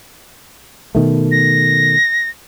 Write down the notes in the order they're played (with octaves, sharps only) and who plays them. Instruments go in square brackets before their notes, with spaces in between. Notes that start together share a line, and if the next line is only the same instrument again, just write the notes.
[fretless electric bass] B2 D#3 A3
[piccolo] A#6